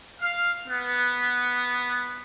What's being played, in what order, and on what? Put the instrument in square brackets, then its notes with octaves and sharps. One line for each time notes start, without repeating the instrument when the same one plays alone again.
[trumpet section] F5
B3